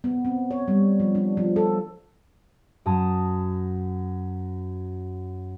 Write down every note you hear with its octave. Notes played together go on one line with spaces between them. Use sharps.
B3
C4
C#5
G3
F3
D4
F3
A4
F#2 A5 D#6